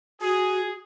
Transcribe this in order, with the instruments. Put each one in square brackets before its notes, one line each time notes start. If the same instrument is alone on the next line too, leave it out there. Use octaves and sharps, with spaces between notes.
[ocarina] F#4 [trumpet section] G#4